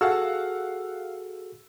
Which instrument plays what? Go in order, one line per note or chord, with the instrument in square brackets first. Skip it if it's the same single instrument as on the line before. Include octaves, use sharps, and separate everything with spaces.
[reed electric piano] F#4 G#4 A4 [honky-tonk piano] F5 F#5 E6